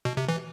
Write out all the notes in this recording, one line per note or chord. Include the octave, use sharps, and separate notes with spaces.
B2
C3
E3